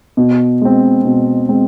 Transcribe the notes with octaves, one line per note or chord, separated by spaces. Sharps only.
B2
G#3 C4
B2
G#3 C4